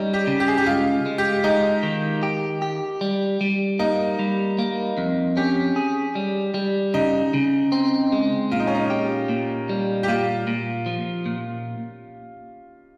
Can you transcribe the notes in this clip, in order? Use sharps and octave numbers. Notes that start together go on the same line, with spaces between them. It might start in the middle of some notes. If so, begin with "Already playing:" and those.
Already playing: G3 C#4 D#4
G4
C#3
G4
G#4
G4
G#3 F4
G#3
G4
G#3 D#4
D#3
G4
G4
G3
G3
A#3 D#4
G3
A#3
F2
C#4 G4
G#4
G3
G3
C#3 D#4
C#3
C4
G#3
A#2 F4
D#4
C#4
D#4
G4
A#2
G3
G4
A#2 F4
A#2
F3
A#2